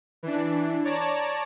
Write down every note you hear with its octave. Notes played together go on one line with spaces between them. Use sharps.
E3 D4
C#5 D5 A5 A#5